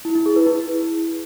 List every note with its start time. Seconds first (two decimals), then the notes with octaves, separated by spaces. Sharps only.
0.05 E4
0.15 E4
0.26 G#4
0.36 B4
0.47 E4